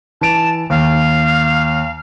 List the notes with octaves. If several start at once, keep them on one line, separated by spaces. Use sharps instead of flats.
E3 A5 D7 F7
D#2 F5